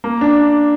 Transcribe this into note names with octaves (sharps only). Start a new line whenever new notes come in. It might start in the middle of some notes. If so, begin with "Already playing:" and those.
A#3
D4